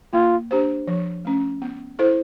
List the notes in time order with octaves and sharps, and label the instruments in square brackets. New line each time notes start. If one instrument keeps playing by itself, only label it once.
[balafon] A#3 [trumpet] F4
[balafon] D4 G4 C5
F3
A3 C#4
B3
E4 A4 C5